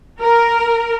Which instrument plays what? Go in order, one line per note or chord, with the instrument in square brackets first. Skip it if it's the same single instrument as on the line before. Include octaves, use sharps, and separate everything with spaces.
[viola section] A#4